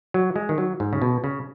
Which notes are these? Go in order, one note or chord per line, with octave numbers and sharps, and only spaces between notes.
F#3
G#3
D#3
F#3
G#2
C#3
B2
C#3